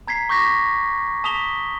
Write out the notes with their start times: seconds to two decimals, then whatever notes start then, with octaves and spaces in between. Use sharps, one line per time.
0.07 A#5 G#6 B6 C7
0.29 C#6 D6 G6 A#6 B6
1.24 A5 D#6 B6 F7 G7